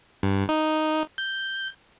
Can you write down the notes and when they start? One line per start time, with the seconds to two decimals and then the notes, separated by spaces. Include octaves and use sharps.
0.23 G2
0.49 D#4
1.18 G6